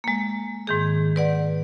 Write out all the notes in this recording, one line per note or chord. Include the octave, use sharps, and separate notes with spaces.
G#3 A#3
G#2 D#3 G#4
B4 D5 F#5